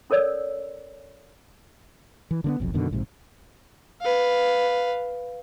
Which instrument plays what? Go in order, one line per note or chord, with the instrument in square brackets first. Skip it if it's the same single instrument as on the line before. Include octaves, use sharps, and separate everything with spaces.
[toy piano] C#4 A4 A#4 C#5 D5 E6
[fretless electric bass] E3
D3 A#3 B3
F1 B1 F2
F#2 B2 D3 D#3
A#1 G#2 C3
[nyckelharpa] B4 F5